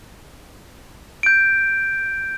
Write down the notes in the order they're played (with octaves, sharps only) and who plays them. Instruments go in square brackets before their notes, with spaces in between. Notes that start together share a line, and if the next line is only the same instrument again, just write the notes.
[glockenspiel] G6 D7